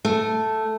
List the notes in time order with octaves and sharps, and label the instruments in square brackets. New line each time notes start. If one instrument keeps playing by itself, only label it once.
[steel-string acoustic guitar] A3